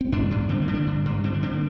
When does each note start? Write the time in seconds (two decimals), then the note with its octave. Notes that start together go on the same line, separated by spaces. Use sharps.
0.01 C4
0.12 G2 D4
0.31 G2
0.49 D3 C4
0.62 A#3
0.68 D3
0.74 D4
0.86 G2
1.05 G2
1.24 D3 C4
1.34 D4
1.43 D3 C4
1.53 A#3